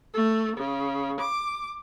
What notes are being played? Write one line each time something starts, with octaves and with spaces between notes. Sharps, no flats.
A3
C#3
D6